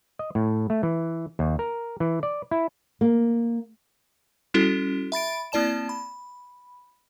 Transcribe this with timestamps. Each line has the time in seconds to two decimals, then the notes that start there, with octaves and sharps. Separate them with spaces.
0.19 D#5
0.35 A2
0.70 A3
0.83 E3
1.39 D#2
1.59 A#4
2.00 E3
2.23 D5
2.51 E4
3.01 A#3
4.54 G3 C#4 E4 F#4 A4
5.12 E5 B5 A6 D7
5.52 A#3 C4 E4 D5 A5 E7
5.89 B5